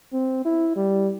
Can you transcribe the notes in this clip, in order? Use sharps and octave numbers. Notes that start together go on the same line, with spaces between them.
C4
E4
G3